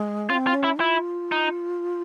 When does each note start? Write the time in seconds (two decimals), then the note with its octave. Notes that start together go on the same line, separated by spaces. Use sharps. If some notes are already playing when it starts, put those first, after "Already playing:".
Already playing: G#3
0.30 C#4 F4
0.34 C4
0.47 F4
0.54 C#4
0.64 E4
0.80 E4 F4
1.32 D#4